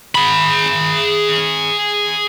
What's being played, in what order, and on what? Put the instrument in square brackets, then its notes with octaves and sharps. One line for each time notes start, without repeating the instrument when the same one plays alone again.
[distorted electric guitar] G#4 B5